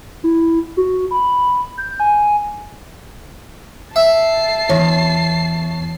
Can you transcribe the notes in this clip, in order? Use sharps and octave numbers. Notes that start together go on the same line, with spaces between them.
E4
F#4
B5
G6
G#5
E5 A5 C7
E2 C#5